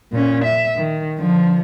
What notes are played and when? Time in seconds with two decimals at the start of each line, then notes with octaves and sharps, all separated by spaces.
0.12 A#2 C#4
0.44 E5
0.76 D#3
1.18 D3 F3